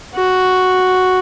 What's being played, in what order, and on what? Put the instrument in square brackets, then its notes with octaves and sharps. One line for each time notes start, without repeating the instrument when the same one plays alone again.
[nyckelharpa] F#4